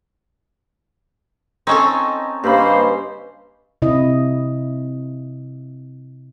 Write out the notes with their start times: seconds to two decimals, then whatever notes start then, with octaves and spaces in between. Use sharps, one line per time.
1.67 C4 C#4 D#4 A4 C#5
2.44 G2 C#3 G3 A#3 C5 B5
3.82 C3 E4 D#5